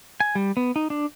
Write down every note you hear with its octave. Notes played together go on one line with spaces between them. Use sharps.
G#5
G3
B3
D#4
D4